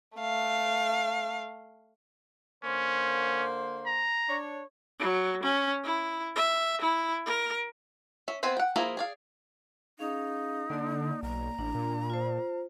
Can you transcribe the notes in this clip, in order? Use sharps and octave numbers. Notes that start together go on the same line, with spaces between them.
A3 F5
D3 A#3 C#4 C5
A#5
D4 C#5
F#3
C#4
E4
E5
E4
A#4
C#4 E5
B3 C4 C5 E5 G#5
F#5 G5
F3 A#3 E4 G#4 A#4
G#4 D5 F5
C#4 D#4 G#4 F5
D3 A#3 D5
B1 A#5
A1 D4
A#2
F4 C5